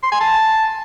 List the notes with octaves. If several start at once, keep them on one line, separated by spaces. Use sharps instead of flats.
C6
G#5
A5